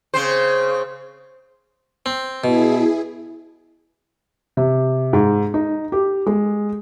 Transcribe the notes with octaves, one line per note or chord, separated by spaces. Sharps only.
C#3 C4 C5
C4
B2 E4 G#4
C3
G#2
D#4
G4
G#3